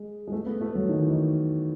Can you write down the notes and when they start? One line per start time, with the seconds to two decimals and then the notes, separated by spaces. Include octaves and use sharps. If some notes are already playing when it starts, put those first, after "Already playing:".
Already playing: G#3
0.27 G#3
0.32 A3
0.46 B3
0.61 A3
0.75 F#3
0.89 D#3
1.00 E3
1.10 D#3